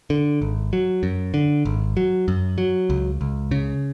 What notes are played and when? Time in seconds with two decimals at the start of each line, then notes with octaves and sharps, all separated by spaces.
0.10 D3
0.42 G#1
0.73 F#3
1.03 F#2
1.34 D3
1.65 G#1
1.97 F#3
2.28 F#2
2.58 F#3
2.90 C#2
3.21 C#2
3.51 C#3